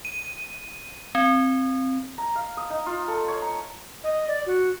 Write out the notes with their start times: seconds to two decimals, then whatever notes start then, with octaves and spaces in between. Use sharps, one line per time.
0.05 D#7
1.15 C4
2.18 A#5
2.35 F5
2.57 D#6
2.70 D#4
2.86 F4
3.08 A4
3.28 C#5
3.42 A#5
4.04 D#5
4.28 D5
4.46 F#4